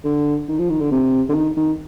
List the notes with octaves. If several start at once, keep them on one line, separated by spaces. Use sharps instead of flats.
D3
D#3
F3
D#3
D3
C3
D3
D#3
D#3